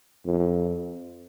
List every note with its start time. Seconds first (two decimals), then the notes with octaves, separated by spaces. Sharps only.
0.25 F2